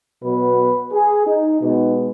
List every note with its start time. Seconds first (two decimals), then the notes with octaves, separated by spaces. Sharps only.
0.23 B2 F#3 B3 B4
0.92 G#4
1.26 D#4
1.60 B2 G#3 B3 D#4